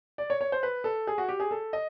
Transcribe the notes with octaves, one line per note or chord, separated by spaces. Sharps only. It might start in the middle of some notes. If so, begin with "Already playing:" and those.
D5
C#5
C#5
C5
B4
A4
G#4
F#4
G4
G#4
A4
D#5